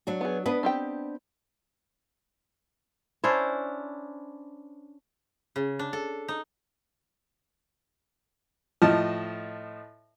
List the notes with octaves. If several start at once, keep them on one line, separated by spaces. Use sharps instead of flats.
F#3 D4 F#4
B3 G#4
B3 D4 B4 D#5
C4 G4 G5
C#4 D4 E4 C5
C#3
D4
A4
D#4
A2 F3 D#5 A5 F6